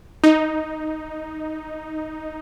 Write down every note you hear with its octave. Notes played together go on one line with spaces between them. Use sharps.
D#4